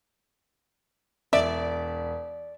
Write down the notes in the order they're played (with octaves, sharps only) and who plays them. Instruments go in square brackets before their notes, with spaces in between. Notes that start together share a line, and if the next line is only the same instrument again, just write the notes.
[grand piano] E1 [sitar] D5 [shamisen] E5